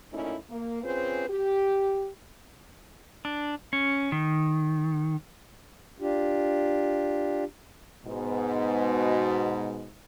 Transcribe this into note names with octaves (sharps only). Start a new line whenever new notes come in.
F#2 A#2 A3 C#4 D#4 E4
A#3
C4 C#4 F4 G#4 B4 C5
G4
D4
C#4
D#3
D4 F4 G4
G#2 B2